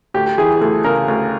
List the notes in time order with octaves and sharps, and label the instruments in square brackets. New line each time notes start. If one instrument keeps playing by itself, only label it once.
[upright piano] D2 G4
G4
E3 G#4
D2 A4
C#3 A#4
D2